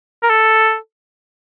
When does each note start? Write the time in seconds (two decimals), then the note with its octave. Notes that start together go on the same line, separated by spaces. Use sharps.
0.23 A#4
0.30 A4